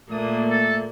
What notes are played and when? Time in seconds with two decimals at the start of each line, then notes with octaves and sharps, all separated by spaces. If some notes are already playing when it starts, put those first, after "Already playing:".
0.11 A#2 A3 A#3 D4 D#6
0.49 A4